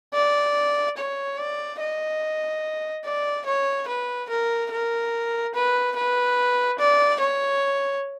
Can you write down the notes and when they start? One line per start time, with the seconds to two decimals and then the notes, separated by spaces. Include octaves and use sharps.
0.14 D5
0.97 C#5
1.38 D5
1.80 D#5
3.05 D5
3.46 C#5
3.88 B4
4.29 A#4
4.71 A#4
5.54 B4
5.96 B4
6.79 D5
7.21 C#5